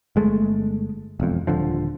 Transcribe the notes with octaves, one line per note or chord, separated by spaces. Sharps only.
G1 G#3 A3
E1 F2
D#1 D3 F3